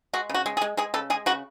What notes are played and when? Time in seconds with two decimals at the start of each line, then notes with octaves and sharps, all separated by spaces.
0.13 G#3 F#4
0.29 C#3 F#4
0.46 G#3
0.57 G#4
0.62 G#3
0.77 G#3 G#4
0.94 C#3 A4
1.10 G#3 G#4
1.26 C#3 F#4